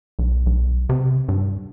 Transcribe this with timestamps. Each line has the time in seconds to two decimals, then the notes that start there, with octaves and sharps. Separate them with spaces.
0.19 B1
0.46 B1
0.89 C3
1.29 G2